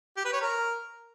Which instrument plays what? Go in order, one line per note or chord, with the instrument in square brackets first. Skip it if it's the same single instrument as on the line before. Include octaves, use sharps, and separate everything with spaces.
[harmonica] G4
B4
C#5
A#4